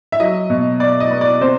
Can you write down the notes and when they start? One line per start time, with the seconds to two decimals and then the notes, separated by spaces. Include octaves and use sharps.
0.12 E5
0.20 F#3 D#5
0.50 B2
0.80 B2 D5
1.00 D#5
1.10 B3
1.21 D5
1.41 C3 C5